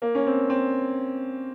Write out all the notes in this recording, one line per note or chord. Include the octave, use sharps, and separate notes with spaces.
A#3
C#4
C4
C4